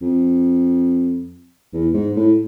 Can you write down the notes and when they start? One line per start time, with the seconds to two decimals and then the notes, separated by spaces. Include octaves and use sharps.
0.02 F2
1.73 E2
1.94 G#2
2.16 A2